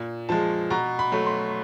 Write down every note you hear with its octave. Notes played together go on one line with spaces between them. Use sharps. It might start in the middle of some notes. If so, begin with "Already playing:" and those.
Already playing: A#2
F3 G#3 A5
B2 A#5
B5
F#3 A3
C6